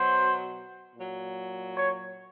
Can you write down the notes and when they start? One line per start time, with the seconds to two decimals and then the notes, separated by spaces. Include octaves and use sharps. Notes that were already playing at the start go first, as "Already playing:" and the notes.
Already playing: B2 F#3 C5
0.95 A#2 F#3
1.76 C#5